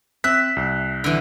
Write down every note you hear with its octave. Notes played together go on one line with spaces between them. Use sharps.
C4 E5 F#6 B6
C2
D3 E3